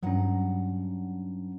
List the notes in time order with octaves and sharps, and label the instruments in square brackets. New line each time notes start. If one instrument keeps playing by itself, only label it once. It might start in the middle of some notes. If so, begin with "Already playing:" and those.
[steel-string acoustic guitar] G2 F#5 A#5 [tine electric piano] F#3 C#4